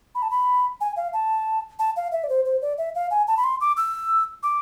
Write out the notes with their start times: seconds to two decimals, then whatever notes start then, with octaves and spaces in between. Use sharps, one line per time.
0.15 B5
0.22 A5
0.31 B5
0.81 G#5
0.97 F5
1.13 A5
1.79 A5
1.96 F5
2.12 E5
2.24 D5
2.29 C5
2.45 C5
2.62 D5
2.78 E5
2.95 F5
3.11 G#5
3.28 A5
3.37 B5
3.44 C6
3.61 D6
3.77 E6
4.43 D6